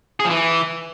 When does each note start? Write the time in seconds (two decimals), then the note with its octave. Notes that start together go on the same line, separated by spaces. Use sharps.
0.20 G#4
0.25 F3
0.30 E3